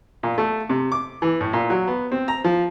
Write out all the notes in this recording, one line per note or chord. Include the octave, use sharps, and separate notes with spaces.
A#2
A3
C3
D6
E3
A2
A#2
F#3
B3
C4
A#5
F3